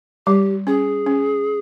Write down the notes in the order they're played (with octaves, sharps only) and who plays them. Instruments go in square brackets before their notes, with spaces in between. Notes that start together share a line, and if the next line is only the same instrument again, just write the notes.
[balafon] G3 [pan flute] G4
[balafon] C#4 [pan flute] G#4
[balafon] C#4